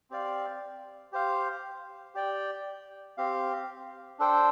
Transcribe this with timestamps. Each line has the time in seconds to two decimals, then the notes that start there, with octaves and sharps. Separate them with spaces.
0.10 C4 G4 D5 F5
1.12 G4 C5 F5
2.15 G4 D5 G5
3.18 C4 G4 F5
4.19 D4 A4 C5 G5